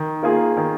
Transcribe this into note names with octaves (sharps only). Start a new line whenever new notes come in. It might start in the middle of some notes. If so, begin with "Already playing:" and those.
Already playing: D#3
A#3 F4 G#4
D#3